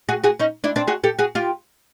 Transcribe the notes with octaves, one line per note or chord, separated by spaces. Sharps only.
F#4 G#4
F#4 G#4
C#4 D#4
D4 E4
C4 D4
F#4 G#4
G4 A4
F#4 G#4
F4 G4